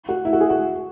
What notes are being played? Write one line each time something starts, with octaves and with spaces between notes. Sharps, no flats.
F#4
E4
F#4
G#4
F#4